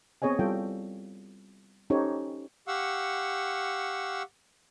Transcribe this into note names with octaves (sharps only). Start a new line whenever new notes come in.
B3 C4 G#4 C#5 D#5 G#5
G3 E4 F4 A4 C#5 G5
C#4 D#4 G4 A4 C5 C#5
G4 F5 F#5 C#6 E6